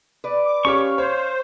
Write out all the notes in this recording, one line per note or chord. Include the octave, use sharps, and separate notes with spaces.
B4 D5
D6
C#4 G4 C#5 F5 C#6
C5 C#5